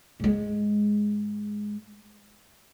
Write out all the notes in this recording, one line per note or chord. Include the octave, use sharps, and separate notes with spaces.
G#2 G#3